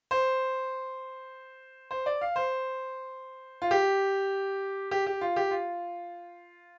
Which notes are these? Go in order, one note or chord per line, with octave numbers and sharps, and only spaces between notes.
C5
C5
D5
F5
C5
F4
G4
G4
G4
F4
G4
F4